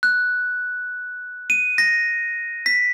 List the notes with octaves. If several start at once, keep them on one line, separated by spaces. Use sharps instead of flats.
F#6
D#7
A#6
B6